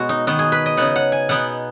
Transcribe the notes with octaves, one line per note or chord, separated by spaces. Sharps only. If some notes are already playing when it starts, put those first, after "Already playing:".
Already playing: B2 G#3 B3 F#4
D#4
D#3 B3 D#4 F#4
G#4
B4
D#5
C#3 B3 D#4 F#5
F#5
G#5
B2 B3 D#4 F#5